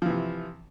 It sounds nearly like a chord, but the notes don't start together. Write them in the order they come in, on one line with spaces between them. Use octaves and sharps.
F3 E3 C3